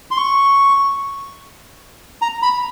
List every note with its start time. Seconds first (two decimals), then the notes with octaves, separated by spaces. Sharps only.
0.11 C6
0.17 C#6
2.22 A#5
2.43 B5